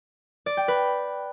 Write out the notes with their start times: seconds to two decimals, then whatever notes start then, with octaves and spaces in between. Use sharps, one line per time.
0.46 D5
0.57 G5
0.68 B4